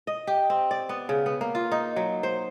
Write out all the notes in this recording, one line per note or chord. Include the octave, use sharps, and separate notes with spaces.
D#5
G4
C4
D5
B3
C#3
B3
A#3
F4
D#4
F#3
C5